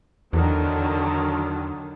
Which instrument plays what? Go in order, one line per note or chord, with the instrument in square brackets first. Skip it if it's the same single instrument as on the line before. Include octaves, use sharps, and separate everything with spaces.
[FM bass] E2 [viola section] D3 D#3 F#3